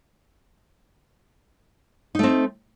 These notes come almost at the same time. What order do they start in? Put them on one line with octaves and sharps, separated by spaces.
D#4 A3 C4